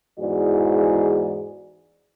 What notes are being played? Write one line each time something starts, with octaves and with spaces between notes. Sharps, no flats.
E2 G#2 E3 F#4 G#4 D5